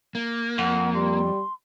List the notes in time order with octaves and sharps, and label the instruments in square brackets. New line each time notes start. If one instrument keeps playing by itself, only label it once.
[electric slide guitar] A#3
[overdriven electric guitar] F2 [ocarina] F#5
[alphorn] G3 [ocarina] C6